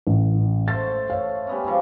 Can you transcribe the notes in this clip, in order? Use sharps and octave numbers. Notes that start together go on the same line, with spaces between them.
A1
A3 C5 A6
C#5 F5
G3 B3 C#4
G#2 F3 D4